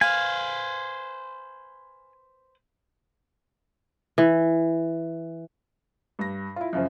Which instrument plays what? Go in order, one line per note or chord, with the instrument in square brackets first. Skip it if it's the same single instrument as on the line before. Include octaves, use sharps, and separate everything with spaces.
[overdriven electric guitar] B4 C5 [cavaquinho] F5 [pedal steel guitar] G#5
[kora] E3
[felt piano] G2 A#6
E4 F4
F#2 C#3 F3